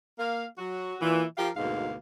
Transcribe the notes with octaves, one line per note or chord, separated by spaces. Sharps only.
A#3 F5
F#3 F#4
A#2 E3
F3 G4 A#4 F5
D2 G#2 B2 A#3 F5